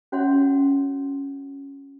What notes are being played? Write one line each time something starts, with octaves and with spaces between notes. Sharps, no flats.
C#4 F#4 C#5 E5 F#5 C6